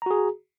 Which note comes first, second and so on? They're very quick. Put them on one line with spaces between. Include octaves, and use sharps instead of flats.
A#5 F#4 G#4